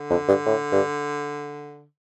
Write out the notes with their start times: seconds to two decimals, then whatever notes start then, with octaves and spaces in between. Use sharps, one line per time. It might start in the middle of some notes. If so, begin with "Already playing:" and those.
Already playing: D3
0.10 F2
0.28 G2
0.46 A2
0.72 G2